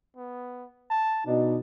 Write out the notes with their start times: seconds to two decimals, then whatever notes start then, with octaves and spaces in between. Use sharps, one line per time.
0.17 B3
0.90 A5
1.27 B2 D4 D#4